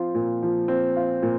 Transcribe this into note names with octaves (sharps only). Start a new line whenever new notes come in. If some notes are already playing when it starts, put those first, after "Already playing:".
Already playing: F3 C4 F4
A#2
F3
C4
F4
A#2